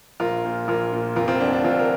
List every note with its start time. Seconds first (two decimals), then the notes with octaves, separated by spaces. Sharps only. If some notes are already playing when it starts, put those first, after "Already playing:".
0.20 A#1 F4 A#4
0.44 A#2
0.68 A#1 F4 A#4
0.93 A#2
1.16 F1 F4 A#4
1.28 C4 F4
1.40 F2 D3 D4
1.53 D4
1.64 F1 C4 F4
1.79 A#4